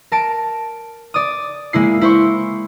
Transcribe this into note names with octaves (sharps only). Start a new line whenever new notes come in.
A#4 A5 D7
D5 D#6
G#3 A#3 E4 C7
E4 C5 C#6